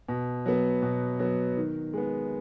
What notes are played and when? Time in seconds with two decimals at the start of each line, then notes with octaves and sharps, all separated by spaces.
0.09 B2
0.46 F#3 B3
0.82 B2
1.19 F#3 B3
1.57 D#3
1.94 G#3 B3